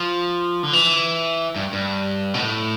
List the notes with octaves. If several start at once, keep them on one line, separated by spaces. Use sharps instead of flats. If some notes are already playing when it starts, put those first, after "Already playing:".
Already playing: F3
D3
E3
G2
G2
B2
A2